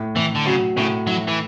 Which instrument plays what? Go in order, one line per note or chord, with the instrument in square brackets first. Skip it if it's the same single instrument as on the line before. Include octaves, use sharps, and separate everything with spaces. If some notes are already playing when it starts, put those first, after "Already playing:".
Already playing: [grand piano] A2
[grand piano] A2 [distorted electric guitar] E3
[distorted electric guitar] D3
[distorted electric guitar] C#3 [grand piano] F#3
[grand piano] A2 [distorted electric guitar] C#3
[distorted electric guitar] F#3 [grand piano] E4
[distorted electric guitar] E3